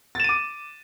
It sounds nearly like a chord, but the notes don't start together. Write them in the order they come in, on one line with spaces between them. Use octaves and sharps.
A6 E7 D#7 D6